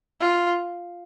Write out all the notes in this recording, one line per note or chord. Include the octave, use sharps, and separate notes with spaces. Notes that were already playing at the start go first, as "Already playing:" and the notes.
F4